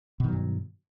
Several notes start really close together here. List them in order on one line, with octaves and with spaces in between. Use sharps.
B2 D#3 F#3 G2